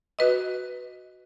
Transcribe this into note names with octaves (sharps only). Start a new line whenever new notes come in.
F#4 B4 D#5